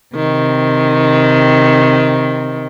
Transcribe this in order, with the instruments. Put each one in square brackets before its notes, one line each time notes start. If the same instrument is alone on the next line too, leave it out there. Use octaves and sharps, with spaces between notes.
[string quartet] C3 D#3